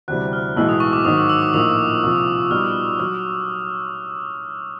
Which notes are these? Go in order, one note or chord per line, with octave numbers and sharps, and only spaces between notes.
D2 C3 E3 G3 F#6
F6
B1 A2 E3 G#3 E6
D#6
C#6
D6
G#2 D#3 F#3 D#6
E6
E6
D6
A#1 A2 F3 A#3 D#4 D#6
C2 A#2 F3
A#2 G3 B3 D#4 F#4 F6
F#3 F6